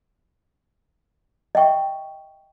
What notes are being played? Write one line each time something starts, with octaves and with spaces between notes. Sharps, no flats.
D#5 E5 G5 C#6